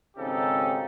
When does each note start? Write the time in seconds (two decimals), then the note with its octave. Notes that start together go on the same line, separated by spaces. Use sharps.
0.17 G#1 C#3 C4 D#4 G4 A4